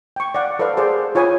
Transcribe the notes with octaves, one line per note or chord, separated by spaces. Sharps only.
G5 C#6
D5 F5 F#5
A4 B4 C5 D5 F5
G#4 A#4 C5 D5 A5
F4 C#5 D#5 G#5 B5 D#6